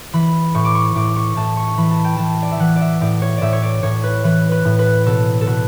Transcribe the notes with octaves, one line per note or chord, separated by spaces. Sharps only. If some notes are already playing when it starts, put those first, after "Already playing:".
E3 B5
A2 C#6
D6
C#6
A2 D6
C#6
A2 A5
C#6
E3 B5
A5
G5
E3 A5
D5
E5
E3 F#5
D5 E5
A2 D5
C#5
A2 D5 E5
C#5
D5
A2 C#5
B4
E3 B4
B4
A2
B4
B2 A4
A4
B2 B4